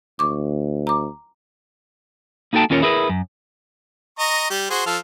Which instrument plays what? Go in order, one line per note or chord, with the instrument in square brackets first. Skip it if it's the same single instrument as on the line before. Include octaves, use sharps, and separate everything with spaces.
[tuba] D2 [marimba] C#6 D6
[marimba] A#5 D6
[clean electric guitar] A#3 D#4 F#4 A4 G5 A5
D#2 C#4 F4 A#4 C#5
E4 G#4 A#4 B4
F#2
[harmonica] D#5 A#5 C#6
G3 G4
F#4 G#4 C5
F3 A4 F5